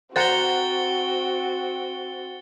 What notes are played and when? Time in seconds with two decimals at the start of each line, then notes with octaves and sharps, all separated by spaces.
0.16 C4 F#4 C5 F#5 A#5 A6 C#7 G7